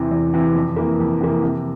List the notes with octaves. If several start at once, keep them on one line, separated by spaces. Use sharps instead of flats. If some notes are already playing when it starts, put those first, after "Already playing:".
Already playing: E2 C3 E3
E2
C3 E3
F2
C3 E3 A#3
F2
C3 E3 A#3
C3